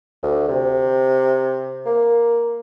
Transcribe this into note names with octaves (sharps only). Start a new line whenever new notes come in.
D2
C3
A#3